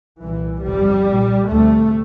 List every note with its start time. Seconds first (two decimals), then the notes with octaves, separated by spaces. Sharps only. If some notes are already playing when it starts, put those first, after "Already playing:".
0.22 C2 A#2 E3
0.65 G1 F2 C3 G3
1.08 C2 A#2
1.50 D2 C3 A3